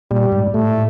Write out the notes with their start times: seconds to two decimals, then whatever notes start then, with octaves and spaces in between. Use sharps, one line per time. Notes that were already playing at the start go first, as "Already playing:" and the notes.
0.11 A#2 G3
0.32 G#2
0.54 A2 A3